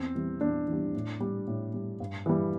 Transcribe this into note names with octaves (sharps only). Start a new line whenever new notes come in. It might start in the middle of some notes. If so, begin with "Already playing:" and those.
Already playing: E2 C4
E3 G3
E2 D4
E3 G3
A2
G3
A2
G3
G2
E3 G3